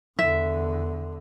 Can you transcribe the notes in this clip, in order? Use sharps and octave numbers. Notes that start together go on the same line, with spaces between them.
E2 D3 E5